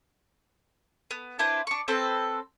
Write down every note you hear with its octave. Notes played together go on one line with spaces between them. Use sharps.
B3
D4 E4 B4 C5
D4 C#6
C4 A4 B4 C5